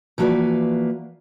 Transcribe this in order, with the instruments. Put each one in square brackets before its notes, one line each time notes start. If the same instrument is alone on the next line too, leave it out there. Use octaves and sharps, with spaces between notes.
[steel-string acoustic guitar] E3 F3 A#3 F#4 B4 D5